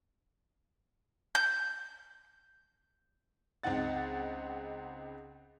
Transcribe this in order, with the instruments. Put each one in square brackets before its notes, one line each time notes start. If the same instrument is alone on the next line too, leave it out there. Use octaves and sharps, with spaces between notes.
[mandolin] G6
[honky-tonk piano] C#2 C4 D#4 F#5 A6